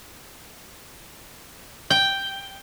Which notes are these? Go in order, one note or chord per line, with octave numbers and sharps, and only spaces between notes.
G5